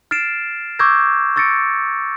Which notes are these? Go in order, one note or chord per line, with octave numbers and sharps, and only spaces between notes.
F6 A6 C7 D7 E7
C#6 D6 E6 G6 G#6 A#6
C#6 E6 A6 A#6 C#7 D7